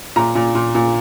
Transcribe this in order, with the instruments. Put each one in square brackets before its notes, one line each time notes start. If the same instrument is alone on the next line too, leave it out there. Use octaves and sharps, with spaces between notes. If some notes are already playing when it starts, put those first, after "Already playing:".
[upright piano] A#2 A#5
A#2
A#2
A#2